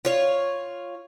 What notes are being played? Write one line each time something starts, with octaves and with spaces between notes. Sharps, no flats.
F4 C#5